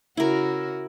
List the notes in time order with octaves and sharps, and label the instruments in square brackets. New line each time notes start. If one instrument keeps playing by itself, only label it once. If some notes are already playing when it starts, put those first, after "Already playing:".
[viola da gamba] C#3 F#4 [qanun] E4 A#4